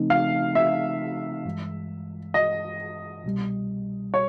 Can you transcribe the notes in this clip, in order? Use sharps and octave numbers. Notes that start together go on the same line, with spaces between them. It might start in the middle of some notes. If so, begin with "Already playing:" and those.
Already playing: C#3 F3 A3 C4 D#4
F5
E5
G2 E3 G#3
D#5
C2 B2 G3
C#5